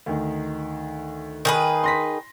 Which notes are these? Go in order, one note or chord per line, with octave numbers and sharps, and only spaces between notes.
D2 D#3
D#3 G#4 B4
C6 A#6 B6